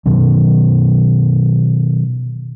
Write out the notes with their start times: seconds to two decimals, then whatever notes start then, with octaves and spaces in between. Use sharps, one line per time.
0.06 B2 D#3 F#3